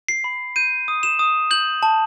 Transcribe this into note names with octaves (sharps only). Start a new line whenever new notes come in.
C7
B5
G6 D#7
D#6
E7
D#6
G6 F#7
A5